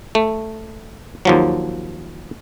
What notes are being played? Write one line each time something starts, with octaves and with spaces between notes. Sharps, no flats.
A3
D#2 F3 F#3